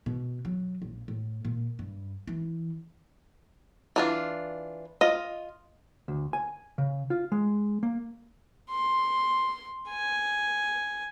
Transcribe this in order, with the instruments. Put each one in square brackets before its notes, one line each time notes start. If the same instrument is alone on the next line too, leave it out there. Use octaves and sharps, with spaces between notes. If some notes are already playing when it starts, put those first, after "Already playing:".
[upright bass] B2
F#3
A#1
A2
A#2
G2
E3
[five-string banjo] E3 D4 F4
F4 D#5
[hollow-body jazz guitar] D2
G#5
C#3
F4
G#3
A#3
[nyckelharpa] C6
G#5